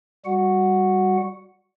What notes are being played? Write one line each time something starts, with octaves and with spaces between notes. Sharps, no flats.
G3 F#4 F#5